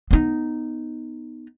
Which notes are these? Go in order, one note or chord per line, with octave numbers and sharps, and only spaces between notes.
B3 D#4